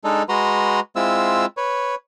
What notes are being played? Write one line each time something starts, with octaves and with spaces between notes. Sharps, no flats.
G#3 D4 D#4 A4
G#3 F#4 B4 A#5 C6
G#3 C4 E4 F4 E6
B4 C#5